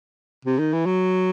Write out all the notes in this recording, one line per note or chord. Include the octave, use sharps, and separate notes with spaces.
C3
D#3
E3
F#3